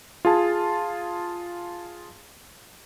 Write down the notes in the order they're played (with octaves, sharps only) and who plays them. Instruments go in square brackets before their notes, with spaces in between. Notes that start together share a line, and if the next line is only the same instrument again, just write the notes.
[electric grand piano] F4 G#4 A5